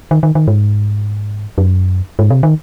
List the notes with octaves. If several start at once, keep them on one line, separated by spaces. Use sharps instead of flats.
D#3
D#3
D#3
G#2
F#2
G#2
C3
D#3